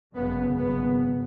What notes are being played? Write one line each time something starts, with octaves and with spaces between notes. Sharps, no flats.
G#1 F#2 C#3 B3
G#1 F#2 C#3 B3